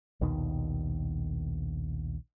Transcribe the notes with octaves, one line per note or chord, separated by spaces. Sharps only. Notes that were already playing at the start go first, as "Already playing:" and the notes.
A#1 D#2 B2 D#3